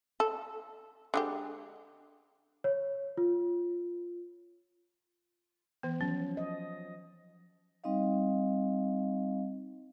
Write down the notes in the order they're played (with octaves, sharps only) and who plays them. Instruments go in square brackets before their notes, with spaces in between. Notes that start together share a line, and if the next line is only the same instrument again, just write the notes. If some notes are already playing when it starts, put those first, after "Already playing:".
[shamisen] A4
D3 G#3 G4
[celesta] C#5
F4
[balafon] E3 B3
[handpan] F3 F#3 [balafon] C#4
[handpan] D#5
[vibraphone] G3 C4 D#4 D#5 F5